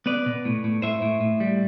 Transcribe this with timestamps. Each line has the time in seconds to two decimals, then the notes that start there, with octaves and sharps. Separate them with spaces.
0.06 B3 B4 D5
0.26 B2
0.45 A2
0.64 A2
0.82 A2 C5 E5
1.02 A2
1.21 A2
1.40 G3